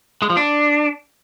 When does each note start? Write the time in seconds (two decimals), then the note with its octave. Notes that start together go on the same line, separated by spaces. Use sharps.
0.22 G#3
0.30 F3
0.37 D4